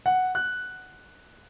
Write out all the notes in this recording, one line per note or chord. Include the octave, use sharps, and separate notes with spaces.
F#5
F#6